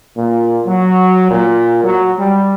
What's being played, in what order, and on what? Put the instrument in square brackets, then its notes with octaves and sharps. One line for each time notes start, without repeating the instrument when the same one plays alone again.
[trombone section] A#2
F#3
A#2
F#3
G3